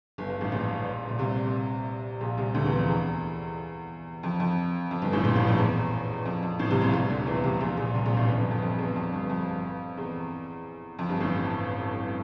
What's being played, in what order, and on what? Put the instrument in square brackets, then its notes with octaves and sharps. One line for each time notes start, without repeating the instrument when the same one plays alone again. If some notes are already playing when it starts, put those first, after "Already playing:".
[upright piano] G1 G2
G1 G2
A1 A2
A#1 A#2
A#2
C2 C3
A#1 A#2
C2 C3
D2 D3
E2 E3
F2
E2
F2
F2
F2
G1 G2
A1 A2
A#1 A#2
A1 A2
F2
E2
F2
F2
A1 A2
C2 C3
A#1 A#2
C2 C3
D2 D3
E2 E3
C2 C3
A#1 A#2
A#1 A#2
C2 C3
A#1 A#2
A1 A2
G1 G2
F2
F2
F2
E2
F2
G1 G2
F2
E2
F2
G1 G2
A1 A2